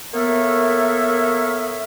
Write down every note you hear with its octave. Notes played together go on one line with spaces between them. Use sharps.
A#3 B3 A4 A#4 C#5 E5